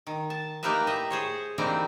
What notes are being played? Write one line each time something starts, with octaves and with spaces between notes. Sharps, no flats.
D#3
A5
A#3 D#4 G4 A#4 B4 E5
A2 D#5 E5
G#4 C5 C#5
D3 E3 G3 A#3 C4 D#4